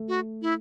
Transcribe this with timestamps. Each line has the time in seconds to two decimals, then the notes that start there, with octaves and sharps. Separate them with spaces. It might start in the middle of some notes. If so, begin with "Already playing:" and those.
Already playing: A3
0.08 F#4
0.42 E4